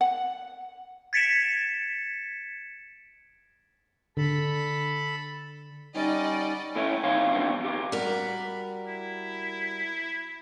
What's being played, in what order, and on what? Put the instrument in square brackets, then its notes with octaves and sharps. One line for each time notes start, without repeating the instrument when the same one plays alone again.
[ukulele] F#5
[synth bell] G#6 A6 B6 C#7 D7 E7
[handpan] D3 [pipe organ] A4 B5
[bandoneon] G3 C#4 [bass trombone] D#4 [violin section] D5 D#5 F#5
[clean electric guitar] E3 A3 C#4 E4
D#3 C4 D#4 C#5 F5 C6
E3 F#3 B3 C4 D4
E2 G4
[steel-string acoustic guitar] G3 F#4 A#4 [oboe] B5
[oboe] E4